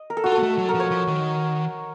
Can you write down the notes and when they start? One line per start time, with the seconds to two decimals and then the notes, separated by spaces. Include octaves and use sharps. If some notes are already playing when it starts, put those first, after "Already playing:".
Already playing: D#5
0.10 A#4
0.17 A4
0.24 F4 F#4
0.32 A4
0.38 A#3
0.43 A3
0.58 F#3
0.69 A#4
0.75 F3
0.80 C#5
0.91 F3
1.08 D#3